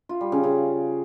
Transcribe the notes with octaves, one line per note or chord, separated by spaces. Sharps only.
F4
G3
C#3
C#3